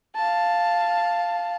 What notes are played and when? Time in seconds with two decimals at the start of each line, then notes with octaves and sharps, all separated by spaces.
0.16 F5 A5